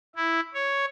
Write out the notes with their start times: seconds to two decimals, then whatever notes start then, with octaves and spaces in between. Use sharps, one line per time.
0.16 E4
0.54 C#5